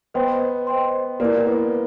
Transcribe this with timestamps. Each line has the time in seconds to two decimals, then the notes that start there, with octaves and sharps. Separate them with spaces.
0.14 B3 C5 D#5 G5 C6
0.67 C5 D#5 G5 C6
1.20 A#3 E4 G4 B4 D5
1.46 B3